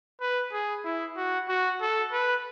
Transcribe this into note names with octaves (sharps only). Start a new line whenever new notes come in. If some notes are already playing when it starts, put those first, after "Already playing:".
B4
G#4
E4
F#4
F#4
A4
B4